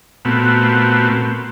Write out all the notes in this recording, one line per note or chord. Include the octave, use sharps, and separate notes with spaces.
A#2 A3 B3 C4 F#4